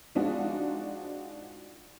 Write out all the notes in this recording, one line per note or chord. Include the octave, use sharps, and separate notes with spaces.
F3 G#3 D4 D#4 F4 F#4